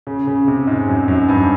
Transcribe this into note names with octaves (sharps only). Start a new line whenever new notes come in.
C#3
C#3
C3
G#2
F#2
F#2
G2